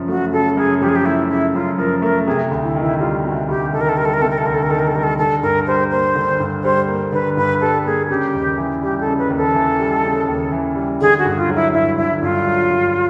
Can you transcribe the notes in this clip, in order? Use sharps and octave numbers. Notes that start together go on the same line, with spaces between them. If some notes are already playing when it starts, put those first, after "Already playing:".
Already playing: F#2 C#3 F3
A3 F#4
C#3 A4
F#2 G#4
F3 G4
G#4
G4
A3 E4
C#3 E4
F#2 F4
F3 A#4
A3 A#4
C3 G#4
D2
E4
D#3
E4
G3 F4
C3 F#4
D2 G4
D#3 A4
A#4
A4
G3 A#4
A4
A#4
C3 A4
A#4
A4
D2 A#4
A4
A#4
D#3 A4
A#4
A4
G3 A#4
A4
D3 A4
G2 A#4
G3 C5
A#3 C5
D3
G2
G3 C5
A#3
D3 B4
G2 B4
G3 A4
A#3 G#4
C#3 G4
D#2
E3
G3 G4
A4
C#3
B4
D#2
A4
E3
G3
C#3
D#2
E3
G3
D3 G#4
F#4
G2
F4
F#3
E4
G2 E4
D3 E4
G2 F4
F#3
G2